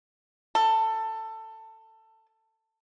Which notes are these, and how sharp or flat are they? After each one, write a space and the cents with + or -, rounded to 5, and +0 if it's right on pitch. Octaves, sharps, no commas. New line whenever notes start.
A4 +15